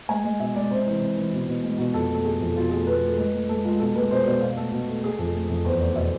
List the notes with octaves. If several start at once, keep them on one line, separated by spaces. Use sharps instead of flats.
G#3 G#5
G#3
B2 E5
G#3 D5
C3 C5
E3
C3
E3
B2
B2
G#3
B2
F2 A4
A3 A4
A3 G#4
F2
B2 F4
A4
A3 G#4
B2 B4
A3
G#3
G#3
G#3 A4
G#3 F4
B2 A4
G#3 B4
B2 C5
B2 D5
B2 F5
A3 A4
B2
A3
A3 G#4
F2 A4
A3
F2
E2 C5
A3 D5
B2 E5